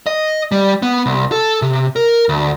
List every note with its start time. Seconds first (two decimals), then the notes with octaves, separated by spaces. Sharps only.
0.07 D#5
0.52 G3
0.82 B3
1.06 C2
1.32 A4
1.62 C3
1.96 A#4
2.29 D2